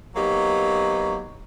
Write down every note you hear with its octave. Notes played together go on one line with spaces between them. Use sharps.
F#3 A#3 B3 D#4 G4